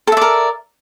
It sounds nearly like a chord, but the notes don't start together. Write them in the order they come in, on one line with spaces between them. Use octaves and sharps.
A4 E5 D5 A#4